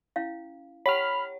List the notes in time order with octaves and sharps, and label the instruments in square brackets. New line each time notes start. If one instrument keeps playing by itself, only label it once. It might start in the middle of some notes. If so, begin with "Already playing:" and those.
[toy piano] C#4 E4 F5
[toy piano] G4 F#5 G5 [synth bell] C#5 [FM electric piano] B5 F6